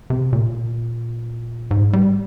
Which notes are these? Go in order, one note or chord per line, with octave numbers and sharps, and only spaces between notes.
C3
A#2
G#2
G3